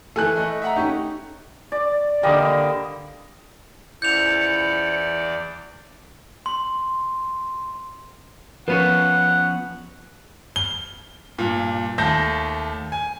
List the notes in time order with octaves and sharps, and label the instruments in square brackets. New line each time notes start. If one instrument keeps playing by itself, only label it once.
[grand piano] E3 A3 [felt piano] A4 G#5 F#6
[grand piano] A3 D#5
E5 F#5 A#5
[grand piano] A3 C#4 G4 [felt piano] D#4
[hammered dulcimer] D5
[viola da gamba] D3 [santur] G3 A#3 G5 [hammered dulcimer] D#5 D6
[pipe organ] E2 D5 [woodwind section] F3 C#4 E4 [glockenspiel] G6 F7 [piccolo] C#7
[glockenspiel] C6
[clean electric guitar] F3 B3 C#4 [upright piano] B4 [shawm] F#5
[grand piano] G7
G2 A#2
D#2 A3 A5 G6 A#6
G#5